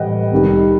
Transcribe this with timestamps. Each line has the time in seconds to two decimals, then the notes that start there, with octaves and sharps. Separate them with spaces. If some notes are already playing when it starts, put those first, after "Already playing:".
Already playing: A2 E3 G3 D#5 F#5 G5
0.31 C2 C3 D#3 G3